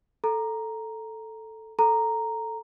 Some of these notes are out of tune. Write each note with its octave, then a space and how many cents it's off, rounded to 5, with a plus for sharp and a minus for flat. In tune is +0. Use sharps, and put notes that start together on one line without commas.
A4 +0 A#5 +0
A4 +0 A#5 -5